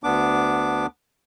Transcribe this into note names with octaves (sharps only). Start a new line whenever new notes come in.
D2 B3 D4 D6